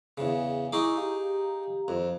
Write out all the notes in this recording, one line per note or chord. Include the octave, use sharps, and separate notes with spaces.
E2 C#3
D#4 E4 G#4 A#5 C#6 D6
G4 F5 A#5
F2